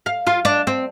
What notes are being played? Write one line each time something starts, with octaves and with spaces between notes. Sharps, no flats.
F5
F4
D4
C4